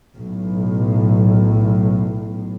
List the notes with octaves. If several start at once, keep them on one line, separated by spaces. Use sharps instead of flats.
B1 A2